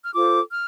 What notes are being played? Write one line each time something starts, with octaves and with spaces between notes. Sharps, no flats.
F6
F4 A4 C5 D6
F6